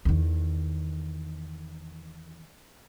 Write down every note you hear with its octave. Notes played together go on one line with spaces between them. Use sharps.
E2 D#3